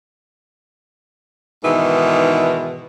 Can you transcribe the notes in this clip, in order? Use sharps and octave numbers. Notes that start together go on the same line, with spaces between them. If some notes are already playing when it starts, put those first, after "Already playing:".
G#2 B2 D#3 E3